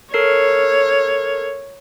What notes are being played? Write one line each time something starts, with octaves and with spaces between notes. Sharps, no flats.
A4 A#4 C#5 C7